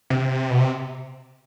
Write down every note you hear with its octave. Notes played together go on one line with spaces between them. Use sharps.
C3
B2
C3